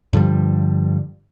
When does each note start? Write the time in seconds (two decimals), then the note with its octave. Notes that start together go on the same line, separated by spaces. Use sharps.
0.13 G2 D3 F3 G3